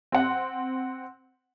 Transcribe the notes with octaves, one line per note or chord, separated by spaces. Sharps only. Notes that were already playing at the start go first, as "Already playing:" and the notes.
C4 F#5